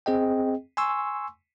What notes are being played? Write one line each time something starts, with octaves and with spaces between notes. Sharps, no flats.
C4 G#4 D#5 G5
G#5 C6 C#6 E6